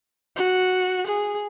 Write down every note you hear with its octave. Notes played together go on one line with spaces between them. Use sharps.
F#4
G#4